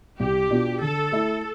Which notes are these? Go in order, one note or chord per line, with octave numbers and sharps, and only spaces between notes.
C2 G4
B2 B3 D4 F4
D3 A4
A3 E4